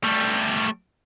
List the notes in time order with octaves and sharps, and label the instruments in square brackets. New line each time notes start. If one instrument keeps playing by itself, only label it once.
[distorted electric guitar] G3 A3